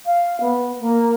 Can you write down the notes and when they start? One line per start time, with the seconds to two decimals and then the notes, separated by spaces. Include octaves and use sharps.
0.06 F5
0.40 B3
0.80 A#3